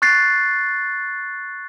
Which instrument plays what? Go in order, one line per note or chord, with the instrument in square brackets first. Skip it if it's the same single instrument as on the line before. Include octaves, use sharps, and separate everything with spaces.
[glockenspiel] C#6 F#6 A6 C7